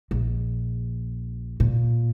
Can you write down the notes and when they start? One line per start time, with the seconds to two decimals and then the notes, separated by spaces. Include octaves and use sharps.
0.11 A#1
1.60 A#2